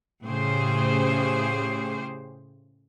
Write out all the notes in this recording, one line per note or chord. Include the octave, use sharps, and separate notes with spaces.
A2 C#3 G4 G#4 C5